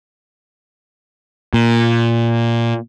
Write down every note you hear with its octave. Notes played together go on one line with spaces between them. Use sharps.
A#2